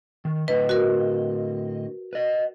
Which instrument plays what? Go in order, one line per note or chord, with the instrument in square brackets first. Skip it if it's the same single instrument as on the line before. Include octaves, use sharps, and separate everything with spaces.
[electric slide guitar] D#3
[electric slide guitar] A2 D3 D#5 [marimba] B4
[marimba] F#4 A#4
[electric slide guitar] B4 D#5